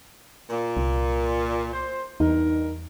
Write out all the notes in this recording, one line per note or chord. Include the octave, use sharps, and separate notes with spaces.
A#2
C2
C5
E2 G2 D#4 A#4